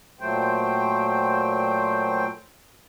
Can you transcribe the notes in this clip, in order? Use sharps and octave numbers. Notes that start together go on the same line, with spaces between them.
A#2 F#3 A3 C5 G5